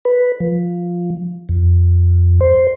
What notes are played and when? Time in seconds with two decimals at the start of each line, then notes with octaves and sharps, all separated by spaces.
0.05 B4
0.40 F3
1.49 F2
2.41 C5